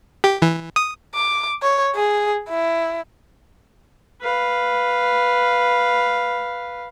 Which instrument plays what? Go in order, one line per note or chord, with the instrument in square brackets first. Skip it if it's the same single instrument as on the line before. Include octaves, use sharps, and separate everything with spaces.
[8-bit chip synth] G4
E3
D#6
[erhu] D6
C#5
G#4
E4
[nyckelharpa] B4 F5